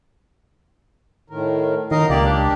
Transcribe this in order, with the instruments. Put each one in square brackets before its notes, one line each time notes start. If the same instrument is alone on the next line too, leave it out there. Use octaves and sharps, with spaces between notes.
[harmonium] A2 D#3 A#4
[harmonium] F#2 D#4 F4 [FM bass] D#3 [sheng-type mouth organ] A#4 D#5 F5
[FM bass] C#2 [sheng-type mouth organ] A#3 G4 D5
[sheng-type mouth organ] D4 G4 [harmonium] A#4 D5